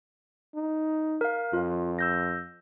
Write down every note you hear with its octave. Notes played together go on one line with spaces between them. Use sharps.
D#4
A#4 F5
F2 F4
E6 G6 A#6